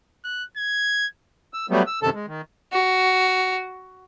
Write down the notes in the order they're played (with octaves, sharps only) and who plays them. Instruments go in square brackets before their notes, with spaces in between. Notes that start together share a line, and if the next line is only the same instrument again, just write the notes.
[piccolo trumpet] F#6
G#6
[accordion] E6
F#3 G3 A3 B3
E6
F#2 C3 D#3 A4 A5
G#3
D#3
[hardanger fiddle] F#4